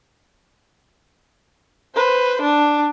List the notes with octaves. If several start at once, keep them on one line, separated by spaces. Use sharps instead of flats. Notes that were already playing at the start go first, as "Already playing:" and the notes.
B4 C5
D4